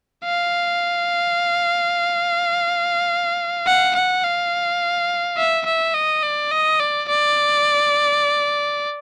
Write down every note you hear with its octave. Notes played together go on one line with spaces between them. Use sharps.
F5
F#5
F#5
F5
E5
E5
D#5
D5
D#5
D5
D5